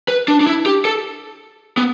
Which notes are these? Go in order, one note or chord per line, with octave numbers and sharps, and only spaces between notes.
B4
D4
D4
E4
G4
A4
B3